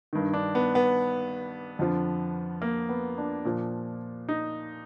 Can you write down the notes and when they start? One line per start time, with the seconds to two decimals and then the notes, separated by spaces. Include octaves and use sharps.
0.13 G2 D#3
0.33 D4
0.55 B3
0.75 B3
1.79 F2 D3 F3
2.62 A#3
2.89 B3
3.18 D4
3.45 A#2 F3
4.28 D#4